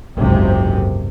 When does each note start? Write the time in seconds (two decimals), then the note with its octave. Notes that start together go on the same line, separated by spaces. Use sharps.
0.17 F#1 C#2 G#2 C3